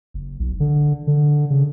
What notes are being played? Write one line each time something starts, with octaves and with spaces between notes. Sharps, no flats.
F#1
B1
D3
D3
C#3